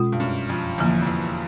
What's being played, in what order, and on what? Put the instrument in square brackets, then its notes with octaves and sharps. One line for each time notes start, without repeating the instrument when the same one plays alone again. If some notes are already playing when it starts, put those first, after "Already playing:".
Already playing: [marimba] B2 G#3 C#4 F4
[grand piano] G2
F#2
F2
[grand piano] E2 [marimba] D3 F3 A#3
[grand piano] F2
E2